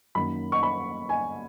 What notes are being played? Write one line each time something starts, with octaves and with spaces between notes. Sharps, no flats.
F#2 D#3 A#3 B5
C#6
B5
G#5